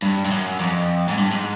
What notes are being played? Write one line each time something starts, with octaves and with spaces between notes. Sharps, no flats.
G2
G2
F#2
F2
G#2
G2
G#2